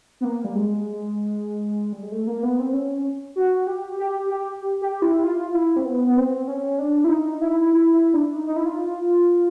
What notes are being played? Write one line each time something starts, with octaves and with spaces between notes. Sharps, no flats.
B3
A#3
G3
G#3
G3
G#3
A3
A#3
B3
C4
C#4
F#4
G4
G4
G4
G4
E4
F4
E4
C4
B3
B3
C4
C#4
D4
E4
D#4
E4
E4
E4
D4
D#4
D#4
E4
F4